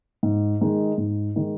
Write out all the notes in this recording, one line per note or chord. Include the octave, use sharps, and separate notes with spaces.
G#2
D#3 G#3 D#4
G#2
D#3 G#3 D#4